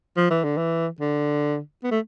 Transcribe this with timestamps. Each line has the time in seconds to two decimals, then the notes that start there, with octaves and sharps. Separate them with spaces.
0.17 F3
0.30 E3
0.44 D3
0.57 E3
1.00 D3
1.84 B3
1.91 A3